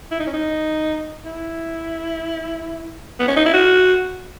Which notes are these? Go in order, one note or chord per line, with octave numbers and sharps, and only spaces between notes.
E4
D#4
C#4
D#4
E4
B3
C#4
D#4
E4
F#4